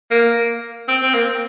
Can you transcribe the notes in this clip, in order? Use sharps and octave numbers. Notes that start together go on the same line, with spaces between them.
A#3
C4
C4
A#3